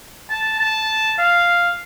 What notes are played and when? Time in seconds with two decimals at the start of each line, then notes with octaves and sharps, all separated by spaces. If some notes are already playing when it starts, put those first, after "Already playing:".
0.30 A5
0.60 A5
1.20 F5